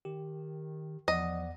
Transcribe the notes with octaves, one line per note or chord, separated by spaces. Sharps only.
D#3 G4
E2 F3 D5 D#5 F#5